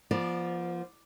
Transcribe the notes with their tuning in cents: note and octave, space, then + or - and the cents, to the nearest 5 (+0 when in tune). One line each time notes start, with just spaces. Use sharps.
F3 -10 B3 -45 D5 +0